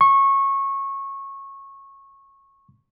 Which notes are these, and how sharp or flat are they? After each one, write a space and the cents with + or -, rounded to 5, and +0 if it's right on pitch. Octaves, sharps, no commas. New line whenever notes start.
C#6 -20